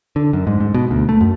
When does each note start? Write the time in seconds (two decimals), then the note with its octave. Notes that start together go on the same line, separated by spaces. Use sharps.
0.16 D3
0.33 F#2
0.47 G#2
0.60 G#2
0.74 B2
0.91 D2
1.09 A3
1.21 F#2